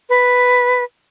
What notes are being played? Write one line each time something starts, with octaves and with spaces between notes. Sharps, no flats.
B4